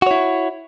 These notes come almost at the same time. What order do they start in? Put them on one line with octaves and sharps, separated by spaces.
F#4 C#5 E4